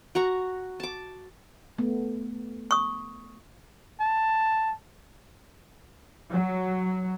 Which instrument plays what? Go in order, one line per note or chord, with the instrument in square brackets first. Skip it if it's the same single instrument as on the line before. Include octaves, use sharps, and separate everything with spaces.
[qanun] F#4 A#5 C#6
A5 D6
[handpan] A3 B3
[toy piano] C#6 D#6
[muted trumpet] A5
[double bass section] F#3